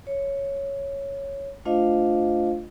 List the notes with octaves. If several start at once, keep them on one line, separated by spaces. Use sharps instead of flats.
C#5
A3 D4 F4 C5 D#5 F5